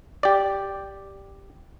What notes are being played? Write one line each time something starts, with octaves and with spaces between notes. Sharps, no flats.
G4 D5